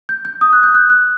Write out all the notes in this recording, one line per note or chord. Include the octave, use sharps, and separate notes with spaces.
G6
G6
D#6
F#6
G6
F#6
F#6